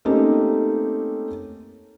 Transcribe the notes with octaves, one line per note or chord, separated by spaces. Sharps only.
A3 A#3 C4 C#4 D#4 G4